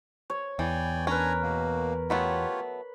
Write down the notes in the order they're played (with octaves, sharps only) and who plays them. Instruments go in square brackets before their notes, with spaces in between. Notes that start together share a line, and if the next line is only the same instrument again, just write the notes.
[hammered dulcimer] C#5
[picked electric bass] E2 [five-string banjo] E3 [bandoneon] D5 G5 G#5
[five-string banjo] C#4 [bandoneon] D4 G#5 A#5 [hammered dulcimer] A#4 B4
[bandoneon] B2 A#3
[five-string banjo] F#3 A3 B3 [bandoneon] F4 G4 C#5 [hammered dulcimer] B5